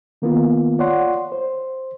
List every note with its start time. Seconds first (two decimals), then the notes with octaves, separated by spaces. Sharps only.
0.22 D#3 A#3 B3 F4
0.78 F4 C#5 D5 F#5 C6
1.32 C5